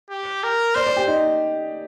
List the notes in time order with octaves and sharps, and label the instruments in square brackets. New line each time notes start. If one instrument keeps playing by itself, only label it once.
[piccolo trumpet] G4
A#4
[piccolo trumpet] C5 [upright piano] D5
[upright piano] D5
G4
D#4